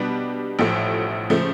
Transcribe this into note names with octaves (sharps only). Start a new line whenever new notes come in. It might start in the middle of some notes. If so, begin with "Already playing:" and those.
Already playing: B2 G3 B3 D4
A1 A2 F3 A3
C#3 F3 A3